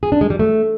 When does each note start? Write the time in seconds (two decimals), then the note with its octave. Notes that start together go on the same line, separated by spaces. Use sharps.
0.03 G#4
0.12 D4
0.21 G#3
0.30 G3
0.39 A3